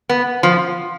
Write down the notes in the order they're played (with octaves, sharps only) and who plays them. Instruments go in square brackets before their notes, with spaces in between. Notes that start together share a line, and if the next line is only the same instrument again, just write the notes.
[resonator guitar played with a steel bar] B3
F3